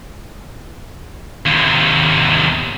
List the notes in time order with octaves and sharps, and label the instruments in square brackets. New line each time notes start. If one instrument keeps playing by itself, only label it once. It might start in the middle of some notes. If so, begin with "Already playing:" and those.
[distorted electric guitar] D#2 C3